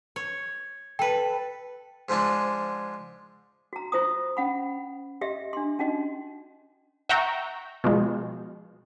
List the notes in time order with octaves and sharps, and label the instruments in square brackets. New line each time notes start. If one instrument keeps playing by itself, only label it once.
[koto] C#5
[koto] A4 B4 [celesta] G5
[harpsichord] G#2 F3 G#3 D4
[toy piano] F#4 A#5
F4 C5 A#5 D#6
C#4 F#5 B5
G4 D#5 E5
D4 C6
C#4 D#4 F#4 D#5
[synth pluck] E5 F#5 G5 A#5 C#6
B2 F3 G#3